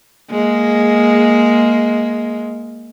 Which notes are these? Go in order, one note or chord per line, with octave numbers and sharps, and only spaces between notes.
G#3 A#3